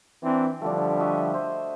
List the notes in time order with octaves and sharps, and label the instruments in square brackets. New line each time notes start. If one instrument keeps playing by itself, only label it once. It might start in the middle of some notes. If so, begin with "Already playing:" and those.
[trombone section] E3 C4 D4
[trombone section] D3 F3 G3 [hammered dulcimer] A3 D4
[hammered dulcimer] F#4 D#5 E5
C5